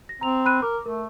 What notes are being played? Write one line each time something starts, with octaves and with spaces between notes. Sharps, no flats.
A#6
C4 A#5 F7
B5 F#6 D#7
A#4 D6
A3 A#4